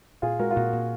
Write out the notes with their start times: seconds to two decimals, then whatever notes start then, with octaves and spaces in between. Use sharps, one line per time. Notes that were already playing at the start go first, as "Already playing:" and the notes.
0.22 A#2 F4 G#4
0.39 G#3 F#4 A#4
0.51 F4
0.56 A#2 F#4
0.73 A#2